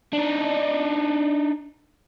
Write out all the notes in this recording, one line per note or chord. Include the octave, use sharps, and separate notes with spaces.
D4 D#4